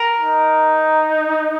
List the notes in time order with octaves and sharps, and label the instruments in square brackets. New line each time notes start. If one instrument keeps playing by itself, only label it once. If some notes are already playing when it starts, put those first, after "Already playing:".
Already playing: [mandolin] A#4
[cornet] D#4